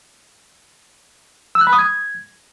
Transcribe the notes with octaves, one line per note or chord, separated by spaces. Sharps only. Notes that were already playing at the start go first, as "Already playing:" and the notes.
E6
F#6
B5
D#6
G#6